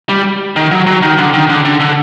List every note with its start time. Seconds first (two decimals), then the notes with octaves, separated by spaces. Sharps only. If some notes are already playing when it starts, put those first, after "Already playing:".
0.09 G3
0.56 D#3
0.71 F#3
0.87 F#3
1.02 D#3
1.18 D3
1.33 D#3
1.49 D3
1.65 D3
1.80 D3